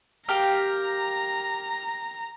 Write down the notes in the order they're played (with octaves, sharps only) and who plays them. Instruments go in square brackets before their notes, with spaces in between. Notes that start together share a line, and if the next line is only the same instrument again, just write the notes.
[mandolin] G4 A#4 F5 [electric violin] A#5